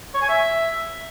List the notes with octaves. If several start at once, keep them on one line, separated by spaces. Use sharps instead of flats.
C#5
G#5
E5